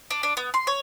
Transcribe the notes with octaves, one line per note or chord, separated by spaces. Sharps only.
D4
D4
B3
C6
C#5